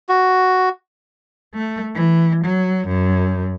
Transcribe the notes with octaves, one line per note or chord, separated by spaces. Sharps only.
F#4
A3
E3
F#3
F#2